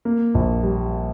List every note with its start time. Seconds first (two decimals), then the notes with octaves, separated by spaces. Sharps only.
0.05 A#3
0.34 A#1
0.63 G3